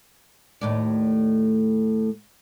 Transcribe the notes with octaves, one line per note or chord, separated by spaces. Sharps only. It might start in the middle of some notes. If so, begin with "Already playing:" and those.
D#2 A2 D5